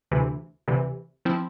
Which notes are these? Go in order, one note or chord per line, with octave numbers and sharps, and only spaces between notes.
D2 C3 E3
D2 C3 E3
F3 C4 E4